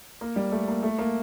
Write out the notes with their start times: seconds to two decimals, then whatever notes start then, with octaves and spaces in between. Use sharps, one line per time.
0.21 A#3
0.36 G3
0.52 A3
0.68 A#3
0.83 A3
0.99 A#3